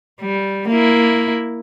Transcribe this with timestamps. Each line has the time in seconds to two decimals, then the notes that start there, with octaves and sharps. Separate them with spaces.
0.21 G3
0.68 A#3 E4